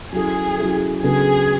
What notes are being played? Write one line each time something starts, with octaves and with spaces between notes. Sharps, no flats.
F#3 C#4 E4 G#4 A4
F#3 C#4 E4 A4
C#3 F#3 B3 D4 G#4 A4